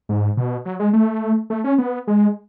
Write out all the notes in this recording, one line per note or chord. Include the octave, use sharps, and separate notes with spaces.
G#2
B2
F#3
G#3
A3
A3
C#4
B3
G#3